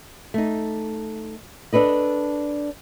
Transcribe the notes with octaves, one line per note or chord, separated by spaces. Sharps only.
A3 D#4
D4 A4 B4 D#5